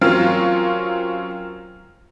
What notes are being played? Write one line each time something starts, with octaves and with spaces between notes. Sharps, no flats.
F#3 C4 C#4 F4 A#4